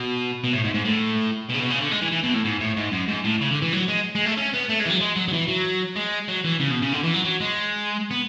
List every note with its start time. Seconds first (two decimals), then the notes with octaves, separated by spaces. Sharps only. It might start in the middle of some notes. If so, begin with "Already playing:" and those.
Already playing: B2
0.44 B2
0.53 A2
0.64 G#2
0.74 G#2
0.85 A2
1.49 B2
1.54 C#3
1.59 B2
1.70 C#3
1.81 D3
1.91 G#3
2.02 E3
2.12 E3
2.24 B2
2.34 A2
2.45 G#2
2.61 A2
2.77 G#2
2.92 F#2
3.09 G#2
3.24 A2
3.41 C#3
3.51 D3
3.62 E3
3.73 F#3
3.88 G#3
4.15 G#3
4.25 A3
4.37 C#4
4.53 B3
4.69 A3
4.79 G#3
4.85 E3
4.89 F#3
5.00 G#3
5.16 F#3
5.28 F#3
5.33 E3
5.48 F#3
5.96 G#3
6.28 F#3
6.45 E3
6.60 C#3
6.71 B2
6.82 C#3
6.93 D3
7.03 E3
7.14 F#3
7.24 F#3
7.41 G#3
8.11 B3